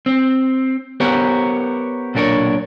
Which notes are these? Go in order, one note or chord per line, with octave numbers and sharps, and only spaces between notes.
C4
B3 G4 A#4 C5 C#5
B1 A#2 D4 A#4 C#5